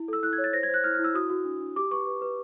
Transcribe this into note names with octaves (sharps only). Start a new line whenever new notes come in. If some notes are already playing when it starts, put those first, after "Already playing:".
Already playing: E4
A4 E6
E4 F#6
G#6
C#5
A6
C5 A#6
G#6
C5 F#6
E4 F6
F6
E4
E6
F#4 D#6
F#4
D4
D4
G4 D6
B4 C#6
B4
B4